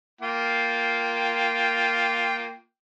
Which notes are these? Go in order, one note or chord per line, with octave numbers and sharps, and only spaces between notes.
A#3 F4 G5